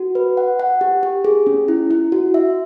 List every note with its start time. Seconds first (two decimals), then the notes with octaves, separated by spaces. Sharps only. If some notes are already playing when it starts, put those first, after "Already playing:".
Already playing: F#4
0.15 B4
0.37 F#5
0.60 F#5
0.81 G4
1.03 G4
1.25 G#4
1.47 C#4
1.68 E4
1.91 E4
2.12 F#4
2.34 E5